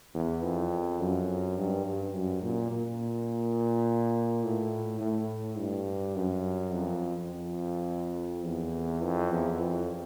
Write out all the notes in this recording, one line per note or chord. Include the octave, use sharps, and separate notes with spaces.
E2
F2
F#2
G2
G2
F#2
A#2
A#2
A2
A2
G2
F#2
F2
F2
E2
F2
E2
F2